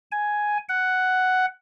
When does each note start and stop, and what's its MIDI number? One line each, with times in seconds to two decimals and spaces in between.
0.12 0.58 80
0.69 1.46 78